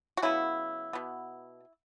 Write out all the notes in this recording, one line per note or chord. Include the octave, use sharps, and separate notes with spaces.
F#4
C#3 F#3 B3 E4
B2 B3